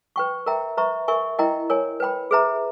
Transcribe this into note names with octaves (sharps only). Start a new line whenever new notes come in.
B4 G5 C#6
A#4 E5 G5 A#5
B4 E5 A#5 C#6
A#4 E5 G#5 C#6
E4 A#4 D#5 G5 A#5
A#4 C#5 G#5
B4 G5 B5
G#4 B4 E5 A#5